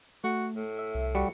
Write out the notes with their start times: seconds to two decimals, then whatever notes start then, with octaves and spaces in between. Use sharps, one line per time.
0.24 A3 F#4
0.56 A2
0.79 E5
0.95 C2
1.15 G3 F#4 C#7